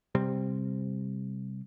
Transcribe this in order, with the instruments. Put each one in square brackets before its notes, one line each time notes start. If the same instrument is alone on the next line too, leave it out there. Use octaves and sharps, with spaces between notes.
[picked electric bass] C3 G3 C4